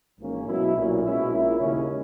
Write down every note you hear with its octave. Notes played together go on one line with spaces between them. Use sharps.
G#1 G#2 E3 A#3 C#4
B2 F#3 B3 E4
B1 A#2 F#3 C#4
B2 G#3 C#4 E4
A#1 A#2 A#3 E4
D#2 C#3 G#3 C#4